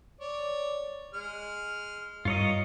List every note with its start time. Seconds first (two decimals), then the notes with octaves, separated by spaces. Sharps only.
0.21 C#5 D5
1.14 G#3 F6
2.25 G2 F4 A#4 C#5 D#5